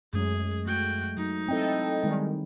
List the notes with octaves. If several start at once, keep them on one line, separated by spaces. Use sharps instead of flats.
F#2 F#3 G#3 A3 G#4
A3 F#4 G5
F#3 D#4
C4 E4 A4 D#5 G5
D#3 G3 G#3